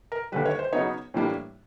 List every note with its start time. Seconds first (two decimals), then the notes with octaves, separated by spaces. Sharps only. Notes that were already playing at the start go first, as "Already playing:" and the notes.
0.12 A#4
0.32 D#2 D3 G3 B4
0.46 C#5
0.59 C5
0.73 C#3 F#3 B3 D#4 C#5
1.14 A2 E3 G3 A#3 D4